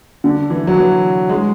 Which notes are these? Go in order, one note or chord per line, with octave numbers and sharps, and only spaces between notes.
D3
E3
F#3
E3
G#3